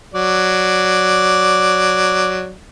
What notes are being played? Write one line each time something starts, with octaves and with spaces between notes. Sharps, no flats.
F#3 D5